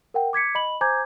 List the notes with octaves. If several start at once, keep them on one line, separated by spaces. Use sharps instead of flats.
A#4 F#5 G5
D6 G#6 B6 C#7
D#5 B5 F#7
C5 G#5 A#5 D6 G6 G#6